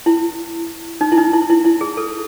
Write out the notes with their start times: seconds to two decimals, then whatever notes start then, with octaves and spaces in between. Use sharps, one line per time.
0.06 E4
1.01 D#4
1.12 E4
1.18 D#4
1.33 E4
1.50 E4
1.65 E4
1.81 G#4
1.97 A4